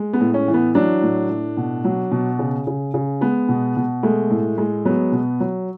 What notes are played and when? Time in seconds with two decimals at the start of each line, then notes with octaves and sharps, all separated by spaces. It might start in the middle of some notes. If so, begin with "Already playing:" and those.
Already playing: G#3
0.13 B3
0.21 A2
0.34 C#4
0.48 E3
0.54 B3
0.75 F#3 D4
1.03 A2
1.30 A2
1.57 B2
1.85 F#3
2.12 B2
2.39 C#3
2.67 C#3
2.94 C#3
3.21 G#3 B3
3.49 B2
3.77 B2
4.03 G#3 A3
4.31 A2
4.58 G#3
4.85 F#3 B3
5.12 B2
5.40 F#3